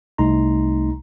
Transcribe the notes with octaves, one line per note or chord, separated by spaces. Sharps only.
C2 A3 D#4 A#5 C6